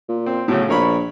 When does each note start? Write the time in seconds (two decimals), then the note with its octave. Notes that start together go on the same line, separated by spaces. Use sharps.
0.09 A#2
0.26 C4
0.48 A2 C#3 F#3
0.69 A#1 A#4 C#5 B5